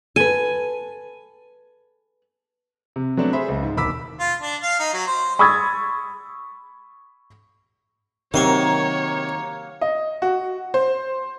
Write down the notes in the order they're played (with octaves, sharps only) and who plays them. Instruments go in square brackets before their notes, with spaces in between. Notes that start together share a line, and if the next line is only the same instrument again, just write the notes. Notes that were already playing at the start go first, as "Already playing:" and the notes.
[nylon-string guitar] A4 B4 [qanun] G#5
[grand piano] C3
F#3 A3 B3 C4 D4
G#4 C5 E5 B5
C#2
G#2
E1 D#2 B5 D6 E6 B6
[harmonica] F4
D4
F5
D#4
F#3
C5
[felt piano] B5 C#6 D#6 E6 G#6 A6
[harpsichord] C3 C6 C#6 [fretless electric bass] D#3 [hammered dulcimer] F#3 A#3 [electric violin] C#5
[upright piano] D#5
F#4
C5